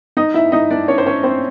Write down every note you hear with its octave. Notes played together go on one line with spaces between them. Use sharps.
D#4 D#5
E4 E5
D#4 D#5
D4 D5
C#4 C#5
C5
C#4 C#5
C4 C5